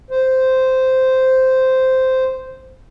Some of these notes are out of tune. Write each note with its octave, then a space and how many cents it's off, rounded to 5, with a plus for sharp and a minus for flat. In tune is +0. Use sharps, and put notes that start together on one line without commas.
C5 -10